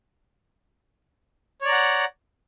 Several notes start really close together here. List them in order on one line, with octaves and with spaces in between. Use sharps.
C#5 D5 A#5 F#5